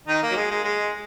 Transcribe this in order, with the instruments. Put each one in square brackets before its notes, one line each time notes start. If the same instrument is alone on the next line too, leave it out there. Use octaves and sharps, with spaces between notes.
[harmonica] D#3 D#4
A#3
F#3
G#3
G#3
G#3